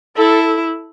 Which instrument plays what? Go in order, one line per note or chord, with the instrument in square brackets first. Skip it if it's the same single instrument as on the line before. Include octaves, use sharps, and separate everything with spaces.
[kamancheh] E4 [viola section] A4